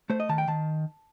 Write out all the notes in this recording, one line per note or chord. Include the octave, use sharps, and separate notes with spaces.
A3 C5
D#5
D#3 A5
G5
D#3 A5